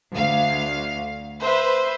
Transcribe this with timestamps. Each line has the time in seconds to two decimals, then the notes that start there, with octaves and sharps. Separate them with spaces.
0.15 D2 F5
1.41 B4 C5 E5